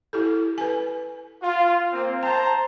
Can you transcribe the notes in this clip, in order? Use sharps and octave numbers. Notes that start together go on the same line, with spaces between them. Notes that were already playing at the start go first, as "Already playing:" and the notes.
E4 G4 A4
B4 G#5
F4
A#3 C4
C5 G5 A5 A#5